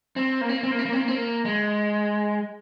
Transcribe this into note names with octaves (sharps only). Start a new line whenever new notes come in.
C4
A#3
C4
A#3
C4
A#3
C4
A#3
C4
A#3
C4
A#3
G#3